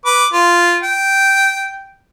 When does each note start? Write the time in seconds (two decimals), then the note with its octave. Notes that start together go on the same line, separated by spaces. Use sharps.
0.06 B4 D6
0.33 F4
0.83 G5